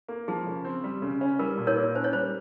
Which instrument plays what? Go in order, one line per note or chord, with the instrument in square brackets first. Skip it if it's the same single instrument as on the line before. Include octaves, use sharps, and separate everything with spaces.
[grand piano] A#3
[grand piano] F3 [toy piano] G#4
[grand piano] C#3
C4
G3
C#3
C#4
[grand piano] G3 [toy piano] A#4
[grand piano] A#2
[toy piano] A#4 C#5
[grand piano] A#3
[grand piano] C#4 [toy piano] C5
[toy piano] C#5
[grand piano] G3 [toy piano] C5